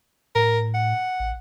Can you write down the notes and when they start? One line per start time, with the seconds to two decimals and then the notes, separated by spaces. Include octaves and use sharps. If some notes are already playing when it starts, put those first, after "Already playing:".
0.35 A2 A#4
0.74 F#5
1.20 A1